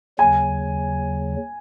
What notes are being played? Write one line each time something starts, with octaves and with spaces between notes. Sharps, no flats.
D#2 C#3 F#3 G#5